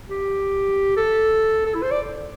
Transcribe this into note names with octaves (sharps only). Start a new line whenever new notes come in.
G4
A4
A4
E4
C5
D5